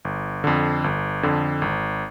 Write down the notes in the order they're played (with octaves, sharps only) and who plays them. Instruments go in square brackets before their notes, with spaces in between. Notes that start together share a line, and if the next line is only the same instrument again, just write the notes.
[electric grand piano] G1
F2 D3
G1
F2 D3
G#1